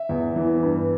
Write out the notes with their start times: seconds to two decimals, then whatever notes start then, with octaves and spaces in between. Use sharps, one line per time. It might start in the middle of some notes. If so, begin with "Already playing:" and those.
Already playing: E5
0.09 E2
0.36 E3
0.63 G2